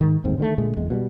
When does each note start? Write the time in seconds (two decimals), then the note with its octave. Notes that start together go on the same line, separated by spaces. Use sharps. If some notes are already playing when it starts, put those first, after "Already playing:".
0.01 G#2 D#3
0.24 G1 D#2 G#2 C4
0.38 D3 D#3 G3 A3
0.58 A#2 D3 G#3 A3
0.77 F#1 E2 G#3
0.90 B2 E3 G3